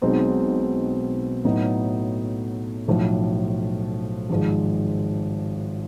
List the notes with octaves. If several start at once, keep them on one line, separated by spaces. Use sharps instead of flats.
B1 B2 G#3 C4 D#4
A2 F#3 B3 D#4
B1 A2 F3
G#1 G#2 F3 G#3